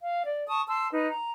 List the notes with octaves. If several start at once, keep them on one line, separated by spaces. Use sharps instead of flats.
F5
D5
A5 C#6 D#6
A5 C6 E6
D#4 B4
A#5